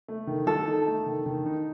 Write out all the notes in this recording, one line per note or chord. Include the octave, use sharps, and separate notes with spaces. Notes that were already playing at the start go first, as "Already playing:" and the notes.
A3
D#3
D#3 A4
D#4
A3
D#3
D#3
D#4